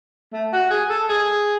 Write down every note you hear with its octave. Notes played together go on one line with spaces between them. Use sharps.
A3
F#4
G#4
A4
G#4